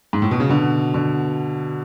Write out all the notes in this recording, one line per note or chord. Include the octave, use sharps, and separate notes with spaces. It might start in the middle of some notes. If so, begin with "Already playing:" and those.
G#2
A2
B2
C#3
B2 D3
B2 D3